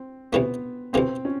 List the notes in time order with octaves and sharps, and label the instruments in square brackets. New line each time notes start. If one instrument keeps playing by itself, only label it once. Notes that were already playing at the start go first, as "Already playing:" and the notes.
Already playing: [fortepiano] C4
[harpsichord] D2 C3 E3 A3 [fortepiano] B3
[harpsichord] D2 C3 E3 A3 [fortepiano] C4
[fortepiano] C#4